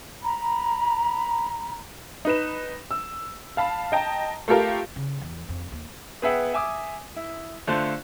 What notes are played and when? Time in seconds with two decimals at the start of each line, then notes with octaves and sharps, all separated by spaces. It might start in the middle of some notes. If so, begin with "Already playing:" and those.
0.23 A#5 B5
2.25 D#4 B4 E7
2.91 E6
3.57 F5 A5 B5
3.92 D#5 G5 A5 A#5
4.48 A3 F4 G4 A4 A#4 F5
4.96 C#3
5.21 E2
5.49 F2
5.72 D#2
6.22 B3 G#4 B4 E5 F#5 G5
6.54 E5 G#5 D6 D#6
7.16 E4
7.67 D3 A3 F4 C5 A5 F#6